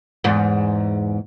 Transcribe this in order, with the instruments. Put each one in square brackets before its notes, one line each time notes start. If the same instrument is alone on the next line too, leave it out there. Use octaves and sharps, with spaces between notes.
[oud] E2 G#2